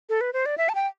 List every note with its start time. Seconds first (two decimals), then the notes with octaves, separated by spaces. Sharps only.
0.09 A4
0.21 B4
0.33 C5
0.46 D5
0.58 E5
0.69 A5
0.75 G5